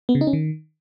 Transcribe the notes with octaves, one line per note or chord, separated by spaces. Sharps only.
B3
C#3
D#4
C#4
D#3